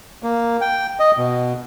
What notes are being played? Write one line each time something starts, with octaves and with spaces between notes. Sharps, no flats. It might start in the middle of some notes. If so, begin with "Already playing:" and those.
A#3
G5
D#5
B2